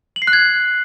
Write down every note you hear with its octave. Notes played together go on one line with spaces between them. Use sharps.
F#7
C7
F#6
G#6